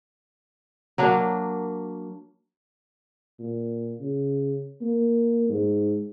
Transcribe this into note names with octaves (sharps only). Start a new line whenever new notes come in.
F#3 A#3 D4
A#2
C#3
A#3
G#2